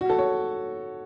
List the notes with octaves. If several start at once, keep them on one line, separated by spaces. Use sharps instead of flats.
F#4
A4
C#5